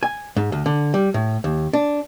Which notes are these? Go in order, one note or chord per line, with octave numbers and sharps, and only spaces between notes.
G#5
G#2
D2
D3
G3
A2
D#2
D4